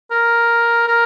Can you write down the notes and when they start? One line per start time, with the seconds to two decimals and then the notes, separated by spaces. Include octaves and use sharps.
0.11 A#4
0.88 A#4